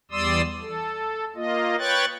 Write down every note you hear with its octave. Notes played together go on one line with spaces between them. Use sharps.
E2 G3 D5 C6 D#6 E6
A4
A#3 F4 D#5
B4 C#5 G5 C#6 F#6 A6